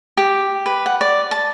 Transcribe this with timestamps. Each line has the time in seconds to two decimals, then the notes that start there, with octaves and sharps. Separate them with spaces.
0.17 G4
0.66 B4
0.86 F#5
1.01 D5
1.31 A5